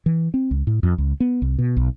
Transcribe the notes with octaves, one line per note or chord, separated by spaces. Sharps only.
E3
C4
C#2
A2
F2
C#2
B3
C2
B2
B1